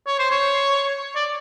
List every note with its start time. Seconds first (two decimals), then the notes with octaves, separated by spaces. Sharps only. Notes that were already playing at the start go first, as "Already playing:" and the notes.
0.07 C#5
0.19 C5
0.31 C#5
1.15 D5